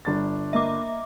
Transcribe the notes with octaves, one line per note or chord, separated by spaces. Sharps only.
G1 D4 A6
A#3 D#5 E5 D6